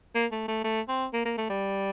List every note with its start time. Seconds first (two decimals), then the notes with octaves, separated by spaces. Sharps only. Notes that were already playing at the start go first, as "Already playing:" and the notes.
0.15 A#3
0.32 A3
0.48 A3
0.64 A3
0.89 C4
1.13 A#3
1.25 A#3
1.38 A3
1.50 G3